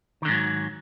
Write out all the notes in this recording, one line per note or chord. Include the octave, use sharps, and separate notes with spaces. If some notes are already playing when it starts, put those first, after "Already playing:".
G#2 D3 D#3 F#3